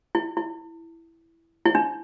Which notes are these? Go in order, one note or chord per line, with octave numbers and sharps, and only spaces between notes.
E4
E4
E4
D4